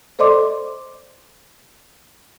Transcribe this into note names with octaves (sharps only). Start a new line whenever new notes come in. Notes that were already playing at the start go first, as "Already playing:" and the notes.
A4 C5 D5 D#5 C6 D6